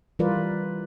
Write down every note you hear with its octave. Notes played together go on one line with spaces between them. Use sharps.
E3 G3 F4 A#4 B4 D5